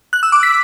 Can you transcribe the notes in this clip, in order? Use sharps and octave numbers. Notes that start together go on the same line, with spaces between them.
F#6
E6
D6
B6